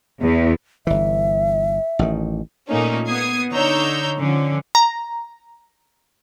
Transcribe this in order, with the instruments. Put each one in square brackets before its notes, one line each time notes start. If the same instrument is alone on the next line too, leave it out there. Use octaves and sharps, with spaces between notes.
[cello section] E2
[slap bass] G1 E3 [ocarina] E5
[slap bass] A1 D#3
[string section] A#2 A3 A#3 C#4 D#4
B3 D#6 G#6 C7
D3 D#4 C#5 A#5 E6 G6
D3 F3 C#4
[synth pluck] A#5